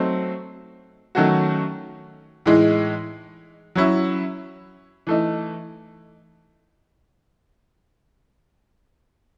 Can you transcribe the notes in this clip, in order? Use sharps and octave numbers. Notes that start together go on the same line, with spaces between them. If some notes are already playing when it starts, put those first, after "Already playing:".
Already playing: F#3 A3 C4 D#4
D#3 F#3 A3 C#4 F#4
A2 E3 G#3 D#4
F#3 C#4 E4
E3 A3 D#4